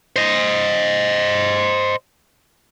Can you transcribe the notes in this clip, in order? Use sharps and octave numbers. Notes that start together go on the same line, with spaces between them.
C5 D#5